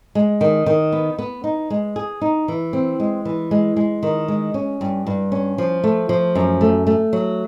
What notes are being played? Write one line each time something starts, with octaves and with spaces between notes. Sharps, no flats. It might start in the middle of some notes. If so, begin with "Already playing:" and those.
G#3
D#3
D#3
B3
B3
D#4
G#3
G#4
D#4
E3
C4
G#3
E3
G#3
G#3
D#3
G#3
C#4
G2
G2
C#4
F3
A3
F3
F#2
A3
A3
F#3